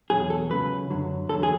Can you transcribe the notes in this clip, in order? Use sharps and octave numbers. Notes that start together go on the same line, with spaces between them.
E2 B2 F#3 G#4
A4
C#2 C#3 F#3 B4
F#2 D3 F#3
E2 D3 F#3 A4
G#4